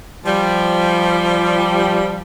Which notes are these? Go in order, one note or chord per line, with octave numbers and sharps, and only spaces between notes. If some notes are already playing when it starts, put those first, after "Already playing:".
F3 G3